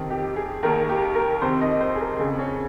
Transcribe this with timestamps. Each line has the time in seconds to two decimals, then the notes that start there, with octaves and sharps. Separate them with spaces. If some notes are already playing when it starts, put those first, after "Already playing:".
Already playing: F2 C3 D#3
0.10 G4
0.36 G#4
0.63 D#2 D#3 A#4
0.89 G4
1.15 A#4
1.41 F2 C3 D#3 C5
1.61 D#5
1.80 C5
1.95 G#4
2.01 A#4
2.19 C#3 G#4
2.24 F2
2.39 C#4